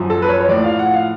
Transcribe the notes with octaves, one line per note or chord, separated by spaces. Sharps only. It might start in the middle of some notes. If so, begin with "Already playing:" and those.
Already playing: F#2 F3
A4
B4
C#5
C#5
A2 F3 D5
F5
F#5
F5